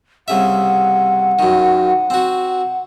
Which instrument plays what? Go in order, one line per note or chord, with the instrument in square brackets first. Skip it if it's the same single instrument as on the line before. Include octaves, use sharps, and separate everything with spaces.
[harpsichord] C2 C#3 E5 [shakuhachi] F#5
[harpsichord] F#2 D#3
C4 F#4